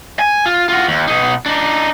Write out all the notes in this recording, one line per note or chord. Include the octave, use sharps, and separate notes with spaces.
G#5
F4
F4 F#4
D#2
B2 D#4
D4 D#4